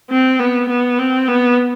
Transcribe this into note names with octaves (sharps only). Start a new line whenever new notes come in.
C4
B3
B3
C4
B3